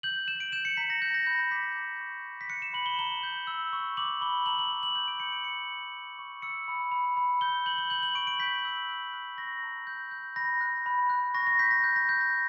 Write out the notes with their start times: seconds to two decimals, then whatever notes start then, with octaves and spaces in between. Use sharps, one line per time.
0.03 G6 F#7
0.28 G6 E7
0.40 D7
0.52 G6 E7
0.65 C#7
0.77 A#5 B6
0.90 A#6
1.02 F#6 G6
1.14 A#6
1.26 B5 G6
1.39 A#6
1.51 D6 B6
1.76 A#5
2.00 C#6
2.24 G6
2.41 B6
2.50 F#6 C#7
2.62 E7
2.74 B5 F#7
2.86 G7
2.99 A#5 G7
3.23 G6
3.47 E6
3.73 C#6
3.97 D6 F#7
4.21 B5 G7
4.46 A#5 F#7
4.59 F#7
4.71 A#5
4.83 F#7
4.95 G6 F#7
5.08 D7
5.20 G6 C#7
5.32 D7
5.44 G6 C#7
5.69 B5
5.94 C#6
6.19 C#6
6.42 E6 C#7
6.68 B5
6.92 B5
7.17 B5
7.41 G6 G7
7.66 G6 F#7
7.78 G7
7.90 G6 F#7
8.03 F#7
8.15 C#6 D7
8.27 D7
8.40 G6 B6
8.65 E6
8.89 F#6
9.13 F#6
9.37 C#6 A#6
9.63 A#5
9.87 G6
10.11 G6
10.36 B5 A#6
10.61 F#6
10.86 B5
11.09 F#6
11.34 C#6 A#6
11.47 A#6
11.59 G6 B6
11.71 A#6
11.84 F#6 G6
11.96 A#6
12.09 F#6 G6
12.21 A#6
12.33 C#6